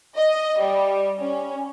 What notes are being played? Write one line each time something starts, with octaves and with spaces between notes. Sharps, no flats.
D#5
G3
C#4